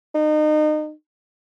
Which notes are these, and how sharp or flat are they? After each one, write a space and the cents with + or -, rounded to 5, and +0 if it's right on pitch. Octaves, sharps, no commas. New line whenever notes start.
D#4 -30